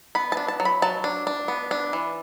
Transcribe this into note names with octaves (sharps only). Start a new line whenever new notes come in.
B3 B5
A5
D4
A5
F#3
B5
F#3 A5
D4
D4
B3
D4
E3